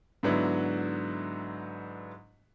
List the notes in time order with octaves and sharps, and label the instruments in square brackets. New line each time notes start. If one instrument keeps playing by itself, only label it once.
[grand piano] G#2 D3 F#3 B3 D4 E4